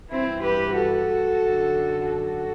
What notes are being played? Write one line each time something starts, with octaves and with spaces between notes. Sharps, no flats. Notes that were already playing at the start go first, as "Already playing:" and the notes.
G2 E3 C4 E4
G4 B4
F#4 A4
F#2 D3
F#4 A4